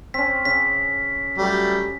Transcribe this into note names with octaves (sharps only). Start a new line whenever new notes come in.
C4 C#4 B6
C#3 B6
F#3 G3 A3